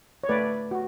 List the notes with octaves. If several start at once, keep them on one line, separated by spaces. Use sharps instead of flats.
C#5
A3 B4 D5
F#4